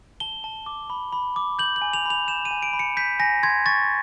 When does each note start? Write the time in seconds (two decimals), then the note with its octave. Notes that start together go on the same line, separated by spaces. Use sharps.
0.20 A5 G7
0.44 A5
0.66 D6
0.90 B5
1.12 B5
1.36 D6
1.59 G6 F#7
1.76 F#7
1.82 G#5
1.93 F7
2.05 B5 F7
2.27 G6 E7
2.45 D#7
2.51 G#5
2.63 D7
2.73 B5
2.79 C#7
2.97 G6 B6
3.20 G#5 A#6
3.43 C6 G#6
3.66 C#6 A6